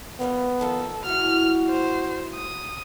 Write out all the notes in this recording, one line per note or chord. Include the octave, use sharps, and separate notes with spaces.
F2 G3 A#3 B3
D3 D#3 F3 A4
A2 E3 F#4 F6
C5
D#6